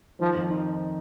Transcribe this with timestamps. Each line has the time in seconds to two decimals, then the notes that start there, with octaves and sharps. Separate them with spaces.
0.20 D#3 F3
0.35 F2
0.50 D#4